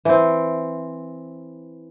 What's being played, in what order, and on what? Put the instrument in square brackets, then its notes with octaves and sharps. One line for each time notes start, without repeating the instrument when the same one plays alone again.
[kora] E3 C4